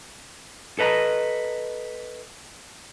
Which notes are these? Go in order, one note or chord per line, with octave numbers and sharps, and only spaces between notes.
A4 B4 D#5 A5 A#5